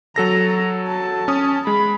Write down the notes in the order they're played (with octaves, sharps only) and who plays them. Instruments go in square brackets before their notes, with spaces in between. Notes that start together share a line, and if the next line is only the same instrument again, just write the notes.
[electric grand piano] F#3 A4 A#6 [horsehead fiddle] A#5
[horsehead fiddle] A5
[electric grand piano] C#4 D#6
[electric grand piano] G#3 [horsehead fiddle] B5